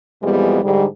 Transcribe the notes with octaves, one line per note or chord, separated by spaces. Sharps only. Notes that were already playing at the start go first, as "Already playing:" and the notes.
F2 B2 E3 G3 G#3 B3
G#2 D3 G3